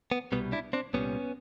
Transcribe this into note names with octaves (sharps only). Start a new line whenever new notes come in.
B3
C2 B2 G3 B3
D4 E4
C4 D4
C2 A#2 G3 B3 C#4